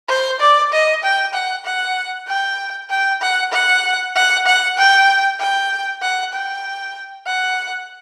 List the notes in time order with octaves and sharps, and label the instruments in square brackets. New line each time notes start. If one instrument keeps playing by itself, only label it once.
[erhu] C5
D5
D#5
G5
F#5
F#5
G5
G5
F#5
F#5
F#5
F#5
G5
G5
F#5
G5
F#5